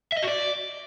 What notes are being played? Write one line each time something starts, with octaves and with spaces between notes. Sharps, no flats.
E5
D#5
F#4
D5